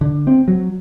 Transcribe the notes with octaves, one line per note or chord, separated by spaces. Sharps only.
D3
C4
F#3